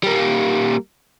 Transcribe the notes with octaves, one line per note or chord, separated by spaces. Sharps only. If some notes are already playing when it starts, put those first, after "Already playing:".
G3 A#3